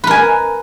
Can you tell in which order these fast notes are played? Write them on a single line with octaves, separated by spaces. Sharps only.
B4 A#4 G#5